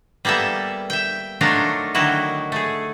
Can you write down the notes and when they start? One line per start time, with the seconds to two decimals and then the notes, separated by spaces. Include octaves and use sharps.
0.25 G3 A#3 B3 A4 E5
0.90 E5 G5
1.41 F#3 A3 D4 D#4 F4 A#4
1.94 D3 D#3 F#3 D#4 E4 F#4
2.52 A3 G#4